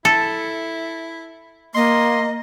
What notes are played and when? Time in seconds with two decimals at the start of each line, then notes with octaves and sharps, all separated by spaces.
0.05 E4 A4
1.75 A#3 D#5 C6